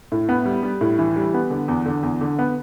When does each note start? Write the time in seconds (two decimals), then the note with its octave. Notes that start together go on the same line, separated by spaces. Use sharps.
0.12 A2
0.29 B3
0.45 G3
0.63 G3
0.81 A2
0.99 E3
1.16 G3
1.34 B3
1.50 D3
1.68 E2
1.86 D3
2.03 E2
2.21 D3
2.39 B3